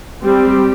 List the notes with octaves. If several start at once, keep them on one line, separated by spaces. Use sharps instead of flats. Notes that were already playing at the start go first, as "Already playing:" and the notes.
G3 C4 G4